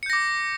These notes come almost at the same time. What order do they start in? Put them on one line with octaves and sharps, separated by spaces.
C#7 G6 A#6 D6